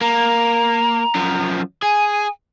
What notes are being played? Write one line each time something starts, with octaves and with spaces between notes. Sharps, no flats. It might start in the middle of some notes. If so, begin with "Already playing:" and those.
A#3 A#5
F#2 F3
G#4 G#5